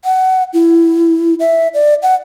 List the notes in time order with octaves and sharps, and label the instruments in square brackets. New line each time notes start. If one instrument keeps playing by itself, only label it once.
[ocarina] F#5
E4
E5
D5
F#5